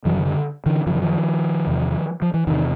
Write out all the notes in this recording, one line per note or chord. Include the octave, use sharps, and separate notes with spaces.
F#2 C#3 E3 F#3
D#3
D3
D3 E3
F#2 C#3 F3
E3
D#3 F3
E2 C3
F3
E3
E2 C3 D#3